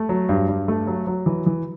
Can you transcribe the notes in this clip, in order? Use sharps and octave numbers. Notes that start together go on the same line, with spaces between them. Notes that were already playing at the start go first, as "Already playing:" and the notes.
Already playing: A3
F#3
G2
G2
A3
F#3
F#3
E3
E3